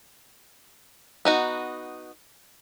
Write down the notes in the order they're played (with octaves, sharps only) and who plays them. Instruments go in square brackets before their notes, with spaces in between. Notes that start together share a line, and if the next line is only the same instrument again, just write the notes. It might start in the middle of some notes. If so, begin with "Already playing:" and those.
[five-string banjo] B3 D#4 F#4